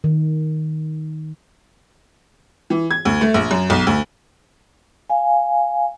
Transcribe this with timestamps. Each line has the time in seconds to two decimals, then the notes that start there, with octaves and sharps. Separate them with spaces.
0.04 D#3
2.70 E3
2.91 G#6
3.05 D2
3.21 A3
3.34 A#1
3.51 F#2
3.70 B1
3.87 D2
5.10 F5 G#5